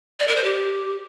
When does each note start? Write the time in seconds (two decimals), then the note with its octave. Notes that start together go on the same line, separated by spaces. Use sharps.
0.19 D5
0.27 A#4
0.36 C5
0.44 G4